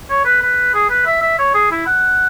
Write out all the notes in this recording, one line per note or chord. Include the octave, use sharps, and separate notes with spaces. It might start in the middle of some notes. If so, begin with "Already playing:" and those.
C#5
B4
B4
G#4
B4
E5
E5
C#5
G#4
E4
F#5